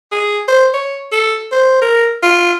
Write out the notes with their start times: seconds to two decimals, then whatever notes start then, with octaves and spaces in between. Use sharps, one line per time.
0.12 G#4
0.48 C5
0.74 C#5
1.12 A4
1.52 C5
1.82 A#4
2.22 F4